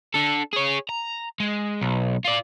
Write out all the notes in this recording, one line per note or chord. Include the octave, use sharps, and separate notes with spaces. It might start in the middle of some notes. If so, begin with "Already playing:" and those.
D4 A4
G#4 C#5
A#5
G#3
B1
F4 D5